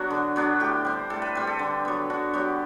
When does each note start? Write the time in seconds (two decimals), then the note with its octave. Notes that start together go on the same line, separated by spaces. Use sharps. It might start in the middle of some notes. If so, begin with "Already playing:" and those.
Already playing: F#3 B3 D4 F#4
0.10 D3
0.36 F#3 B3 D4
0.60 A2 G4
0.85 G3 C4
1.10 A2 A4
1.22 B4
1.35 G3 C4 B4
1.47 A4
1.59 D3
1.85 F#3 B3
2.10 D3 F#4
2.34 F#3 B3 G4